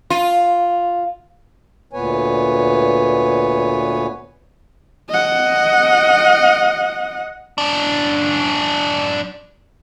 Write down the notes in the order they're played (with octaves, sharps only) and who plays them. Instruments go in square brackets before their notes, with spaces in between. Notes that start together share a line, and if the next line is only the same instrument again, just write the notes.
[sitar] F4
[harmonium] D2 A#2 B3 B4 C#5 G#5
[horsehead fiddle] D#5 F#5
[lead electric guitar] F#2 D4